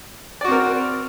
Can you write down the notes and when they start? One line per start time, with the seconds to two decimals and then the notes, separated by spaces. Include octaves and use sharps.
0.41 D5
0.45 F#4
0.48 C4
0.52 A#4